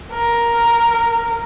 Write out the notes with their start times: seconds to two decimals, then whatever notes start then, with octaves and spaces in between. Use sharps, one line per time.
0.13 A#4